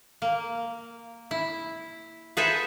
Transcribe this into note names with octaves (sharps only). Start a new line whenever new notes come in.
A#3
E4
G#4 A4 B4 C5 E5 F#5